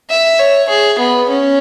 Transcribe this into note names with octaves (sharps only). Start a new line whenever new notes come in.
E5
C#5
G#4
B3
C#4